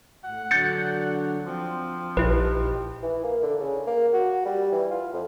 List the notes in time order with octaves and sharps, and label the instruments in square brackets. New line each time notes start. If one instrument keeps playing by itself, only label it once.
[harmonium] A2 [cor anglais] F#5
[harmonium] D3 F#3 D4 [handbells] G6 A6 C#7
[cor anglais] F3 [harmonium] C4
[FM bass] A#1 [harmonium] D#4 G4 [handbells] E4 B4
[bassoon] E3
A#3
D3
C#3
A#3
F#4
G3
E3
F4
F2